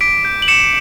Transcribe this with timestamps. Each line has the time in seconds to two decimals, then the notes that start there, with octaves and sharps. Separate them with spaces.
0.01 D6 B6 D7
0.25 G6
0.42 F#7
0.48 D6 C#7 E7